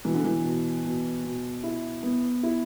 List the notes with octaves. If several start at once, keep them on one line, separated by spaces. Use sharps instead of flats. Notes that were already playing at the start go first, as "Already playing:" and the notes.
B2 E3
D3
E3
B2
B2
B2
E4
B3
E4